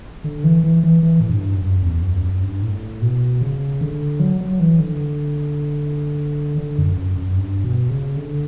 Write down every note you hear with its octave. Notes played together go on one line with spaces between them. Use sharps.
D3
E3
E3
E3
E3
A2
G2
F#2
E2
F#2
F#2
G2
A2
B2
C#3
D3
F#3
F#3
E3
D3
D3
F#2
F#2
F#2
G2
B2
C#3
D3